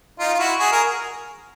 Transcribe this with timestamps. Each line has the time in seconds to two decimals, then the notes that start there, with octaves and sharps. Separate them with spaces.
0.19 D#4 F4
0.34 F4
0.39 E4 F#4
0.59 F#4 G#4
0.72 G#4 A#4